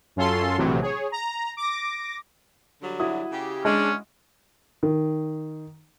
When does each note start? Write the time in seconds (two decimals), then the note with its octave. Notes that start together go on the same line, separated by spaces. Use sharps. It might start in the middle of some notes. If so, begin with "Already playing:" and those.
0.16 F#2 C#4 F4 A4 C6
0.58 A#1 A2 C3 E3 F#3
0.81 G#4 C#5
1.12 A#5
1.57 D6 A#6
2.82 D3 F#3 G3
3.00 E4 F#4 D#6
3.32 C#3 G4
3.65 G#3 C#4 D4
4.83 D#3